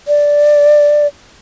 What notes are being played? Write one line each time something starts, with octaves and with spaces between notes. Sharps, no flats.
D5